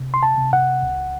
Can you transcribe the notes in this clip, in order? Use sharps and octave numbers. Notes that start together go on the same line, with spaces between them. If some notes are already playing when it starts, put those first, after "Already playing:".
Already playing: C3
C6
A5
C3
F#5
C#2